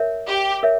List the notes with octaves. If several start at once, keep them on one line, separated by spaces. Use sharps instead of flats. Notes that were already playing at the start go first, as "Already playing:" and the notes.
Already playing: A#4 C#5 E5
G4
A#4 C#5 E5